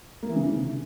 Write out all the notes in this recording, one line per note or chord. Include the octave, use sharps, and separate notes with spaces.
A#3
E3
C#3
D#3
C3